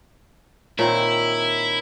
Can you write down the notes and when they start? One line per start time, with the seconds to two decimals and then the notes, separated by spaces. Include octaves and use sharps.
0.79 A#2 D#3 C4 E4 C#5 A#5